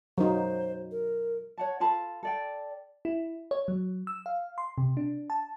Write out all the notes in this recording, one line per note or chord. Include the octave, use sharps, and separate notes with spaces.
F#3 D#4 C5
A#4
C#5 F#5 A5
F4 A4 A5 B5
A4 D5 G5
E4
C#5
F#3
E6
F5
C6
C3
D4
A5